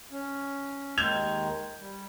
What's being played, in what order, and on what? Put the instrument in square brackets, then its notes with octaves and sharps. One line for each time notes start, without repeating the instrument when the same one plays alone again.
[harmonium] C#4
[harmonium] D#2 D#3 G#3 [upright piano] G6 G#6 F7
[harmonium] G3